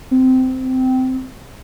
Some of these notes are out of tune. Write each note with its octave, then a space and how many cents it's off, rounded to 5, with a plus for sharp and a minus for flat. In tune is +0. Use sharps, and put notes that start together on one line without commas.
C4 -20